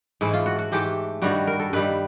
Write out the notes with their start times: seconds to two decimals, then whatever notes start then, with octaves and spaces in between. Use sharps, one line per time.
0.21 G#2 E3 A3 E4
0.33 F4
0.46 F#4
0.59 F#4
0.72 G#2 E3 A3 G4
1.22 G2 D#3 G3 F#4
1.35 F#4
1.47 A#4
1.60 A4
1.73 G2 D#3 G3 B4